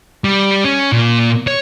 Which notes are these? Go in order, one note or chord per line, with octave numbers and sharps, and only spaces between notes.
G3
C#4
A#2
C#5